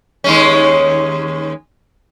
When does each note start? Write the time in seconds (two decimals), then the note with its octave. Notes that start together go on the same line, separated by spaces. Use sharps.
0.24 D#2 G#3 C#4